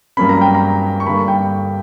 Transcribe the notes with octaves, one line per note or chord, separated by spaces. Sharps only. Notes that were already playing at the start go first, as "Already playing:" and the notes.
G2 F#3 A#3 C#4 B5
A#5
G5
A#5
C#6
G2 D3 A#3 B5
G5